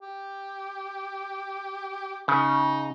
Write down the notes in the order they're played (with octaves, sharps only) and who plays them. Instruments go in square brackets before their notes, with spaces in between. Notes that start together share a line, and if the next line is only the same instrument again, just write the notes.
[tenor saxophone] G4
[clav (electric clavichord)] C#3 [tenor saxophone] D#4